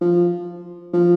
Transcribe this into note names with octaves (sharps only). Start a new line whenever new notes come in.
F3
F3